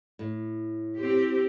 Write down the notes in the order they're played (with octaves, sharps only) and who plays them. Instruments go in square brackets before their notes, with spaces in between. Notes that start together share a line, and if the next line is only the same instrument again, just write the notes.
[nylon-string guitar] A2
[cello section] C4 G4